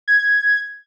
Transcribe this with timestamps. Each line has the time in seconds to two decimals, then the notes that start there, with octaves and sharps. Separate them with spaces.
0.08 G#6